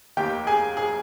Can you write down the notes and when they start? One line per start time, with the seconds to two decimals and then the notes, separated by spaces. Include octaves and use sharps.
0.17 F1 D#2 D#3 G4 G5
0.47 G#4 G#5
0.77 G#4 G#5